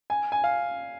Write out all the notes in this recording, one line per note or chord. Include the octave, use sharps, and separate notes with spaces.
G#5
G#5
F5